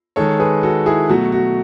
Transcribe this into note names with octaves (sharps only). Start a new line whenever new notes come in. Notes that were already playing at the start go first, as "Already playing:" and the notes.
D#3 G#3 A4 C#5
G#4 B4
F#4 A4
E4 G#4
B2 F#3 A3 F#4
F#4